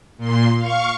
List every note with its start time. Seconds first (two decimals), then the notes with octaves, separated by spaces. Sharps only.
0.18 A#2 C6
0.58 F5 C#6